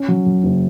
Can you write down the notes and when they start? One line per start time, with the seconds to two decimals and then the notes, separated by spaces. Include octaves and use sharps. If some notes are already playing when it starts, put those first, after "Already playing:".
Already playing: C#4
0.08 F#3
0.26 F#2
0.44 F#1